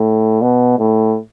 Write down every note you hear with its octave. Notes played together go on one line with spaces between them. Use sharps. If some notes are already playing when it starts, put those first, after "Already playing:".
Already playing: A2
B2
A2